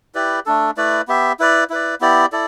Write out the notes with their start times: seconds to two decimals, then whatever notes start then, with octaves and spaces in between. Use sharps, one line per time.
0.15 E4 G4 B4 D5
0.46 A3 D4 A4
0.77 A3 E4 B4 D5
1.08 B3 G4 E5
1.39 E4 B4 D5
1.70 E4 B4 D5
2.01 B3 E4 G4 D5
2.32 E4 A4 D5